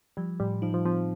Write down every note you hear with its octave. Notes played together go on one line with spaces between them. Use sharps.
F3 G3
A2 G3
F3 D#4
F3
F3 C4